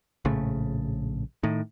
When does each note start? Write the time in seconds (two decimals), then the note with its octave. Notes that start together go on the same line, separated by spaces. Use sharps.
0.25 A#1 A2 C#3 A3
1.43 A2 D#3